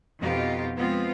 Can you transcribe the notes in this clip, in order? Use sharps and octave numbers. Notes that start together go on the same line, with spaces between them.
F2 B2 F3 D#4 F4 G4
F3 G#3 B3 C4 F4